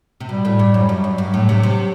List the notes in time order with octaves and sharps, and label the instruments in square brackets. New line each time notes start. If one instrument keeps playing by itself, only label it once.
[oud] C3
[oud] B2 [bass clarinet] G3
[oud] A2
G2
[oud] F#2 [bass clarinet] F#3
[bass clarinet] G3
[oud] F#2 [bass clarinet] F#3
[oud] F#2
G2
A2
C3
C3